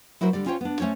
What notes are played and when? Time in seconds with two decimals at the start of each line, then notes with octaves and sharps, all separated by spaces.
0.21 F#3 E4 F#4 A#4 C5
0.33 D3 G3 D5
0.46 C#4 F4 C5 C#5 G5
0.61 B3 D4
0.80 A3 C#4 C5 C#5